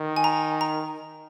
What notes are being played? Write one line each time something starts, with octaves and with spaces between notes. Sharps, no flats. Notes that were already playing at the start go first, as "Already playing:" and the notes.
Already playing: D#3
G#5
A#5
A#5